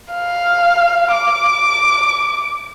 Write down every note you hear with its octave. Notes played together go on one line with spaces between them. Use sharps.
F5
D6